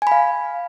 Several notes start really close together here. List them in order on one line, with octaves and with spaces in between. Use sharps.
G#5 B5 F5